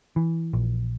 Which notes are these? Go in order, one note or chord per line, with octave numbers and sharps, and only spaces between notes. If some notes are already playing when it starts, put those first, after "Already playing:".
E3
A#1